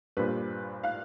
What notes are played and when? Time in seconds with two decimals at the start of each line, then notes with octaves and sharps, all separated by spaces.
0.17 G2 A#2 B4 C5
0.83 F5 F#6